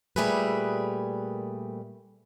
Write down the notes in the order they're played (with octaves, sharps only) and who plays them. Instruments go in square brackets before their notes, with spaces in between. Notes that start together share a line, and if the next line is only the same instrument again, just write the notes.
[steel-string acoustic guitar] A#2 G3 A3 G#4 A#4 B4